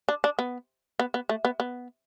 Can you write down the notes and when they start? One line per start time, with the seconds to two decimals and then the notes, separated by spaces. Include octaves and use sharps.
0.09 D4
0.24 D4
0.39 B3
0.99 B3
1.14 B3
1.29 A3
1.45 B3
1.60 B3